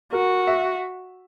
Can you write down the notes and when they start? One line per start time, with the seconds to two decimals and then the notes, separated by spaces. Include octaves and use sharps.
0.13 F#4 A#4
0.47 E5